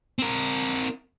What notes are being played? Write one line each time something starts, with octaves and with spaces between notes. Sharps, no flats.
C4 A#4